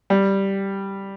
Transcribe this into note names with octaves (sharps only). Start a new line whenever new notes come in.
G3